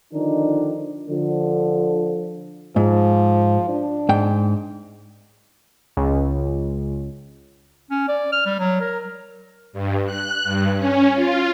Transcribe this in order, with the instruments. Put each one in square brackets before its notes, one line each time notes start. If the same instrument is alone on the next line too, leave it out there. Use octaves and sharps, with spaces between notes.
[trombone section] D3 D#3 F3 D4 D#4
D3 F3
[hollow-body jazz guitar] G#2 [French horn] F3
[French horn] D4
[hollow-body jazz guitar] G#2 G5
[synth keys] C#2
[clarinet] C#4
D5
F6
G3
F#3
A#4
[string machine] G2
F#6
G2
C#4
F4